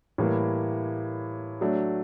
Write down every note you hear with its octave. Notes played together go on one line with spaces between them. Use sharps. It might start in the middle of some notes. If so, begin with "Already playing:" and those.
A2 E3 G3 A#3
F#3 A3 D4